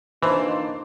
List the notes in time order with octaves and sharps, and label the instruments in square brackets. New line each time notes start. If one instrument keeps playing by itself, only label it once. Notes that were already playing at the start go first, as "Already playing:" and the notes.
[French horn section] F2 A#3 D#5 [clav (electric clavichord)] E3 [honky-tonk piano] D4 C5 [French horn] D#4